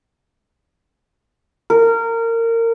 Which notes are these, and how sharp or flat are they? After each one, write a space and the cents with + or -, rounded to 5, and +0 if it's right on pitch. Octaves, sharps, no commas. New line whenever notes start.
A#4 -25